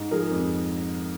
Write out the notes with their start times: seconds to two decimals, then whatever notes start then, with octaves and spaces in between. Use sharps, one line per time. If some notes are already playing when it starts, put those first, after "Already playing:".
Already playing: G#2
0.11 F3 G#4 A#4
0.31 F2